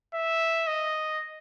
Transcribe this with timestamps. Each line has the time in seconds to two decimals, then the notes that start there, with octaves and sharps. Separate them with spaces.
0.14 E5
0.67 D#5